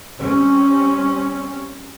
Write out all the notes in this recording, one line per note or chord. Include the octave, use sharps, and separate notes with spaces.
G3 C4 C#4